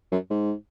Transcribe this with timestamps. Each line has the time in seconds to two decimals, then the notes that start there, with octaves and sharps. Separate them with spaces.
0.12 F#2
0.30 G#2